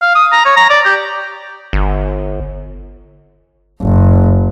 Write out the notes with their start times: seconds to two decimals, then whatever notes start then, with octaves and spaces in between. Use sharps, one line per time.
0.02 F5
0.15 D#6
0.33 A#5
0.45 C#5
0.57 A#5
0.70 D5
0.85 G4
1.73 G1
3.82 F#1